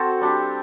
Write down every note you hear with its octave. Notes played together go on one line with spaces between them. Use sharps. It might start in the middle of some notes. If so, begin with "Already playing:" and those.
Already playing: C4 F#4 A4 C5
G3 D4 G4